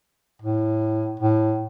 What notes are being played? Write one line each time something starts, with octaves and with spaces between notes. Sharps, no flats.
A2
A2